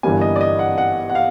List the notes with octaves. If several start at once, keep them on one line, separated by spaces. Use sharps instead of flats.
G1 G2 E3 G3 A#3 G#5
D#5
D5
D#5
F#5
F#5
F#5
F5